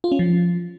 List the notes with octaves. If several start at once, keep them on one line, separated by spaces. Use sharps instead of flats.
F4
C#4
F3